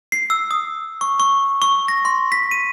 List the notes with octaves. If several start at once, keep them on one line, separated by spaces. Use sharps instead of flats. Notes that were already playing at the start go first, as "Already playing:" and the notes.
C7
E6
D#6
C#6
C#6
C#6
A#6
C6
B6
D#7